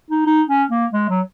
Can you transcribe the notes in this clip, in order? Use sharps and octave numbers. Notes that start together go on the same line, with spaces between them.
D#4
D#4
C#4
A#3
G#3
F#3